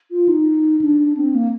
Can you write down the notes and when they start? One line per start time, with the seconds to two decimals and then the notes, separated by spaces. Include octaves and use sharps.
0.12 F4
0.28 D#4
0.81 D4
1.17 C4
1.35 A#3